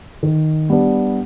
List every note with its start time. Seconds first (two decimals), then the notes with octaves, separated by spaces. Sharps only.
0.23 D#3
0.70 G3 B3 D4